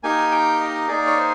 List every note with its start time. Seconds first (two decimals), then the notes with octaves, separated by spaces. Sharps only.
0.03 A#3 D#4 G4 G#5
0.32 G5
0.61 D#5
0.88 A#3 D#4 G#4 D5
1.07 C#5
1.17 C5